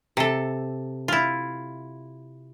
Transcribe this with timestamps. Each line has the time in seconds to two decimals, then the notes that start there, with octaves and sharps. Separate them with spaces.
0.17 C3 A4
1.08 E4 F4